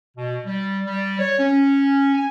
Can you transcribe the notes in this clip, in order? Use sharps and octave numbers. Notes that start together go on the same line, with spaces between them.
B2
G3
G3
C#5
C#4
G#5